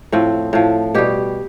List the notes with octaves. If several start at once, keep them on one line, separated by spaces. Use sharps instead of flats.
A2 F3 C4
A2 F3
B2 G3 G4